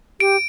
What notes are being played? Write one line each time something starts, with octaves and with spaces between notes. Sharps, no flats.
G4 D7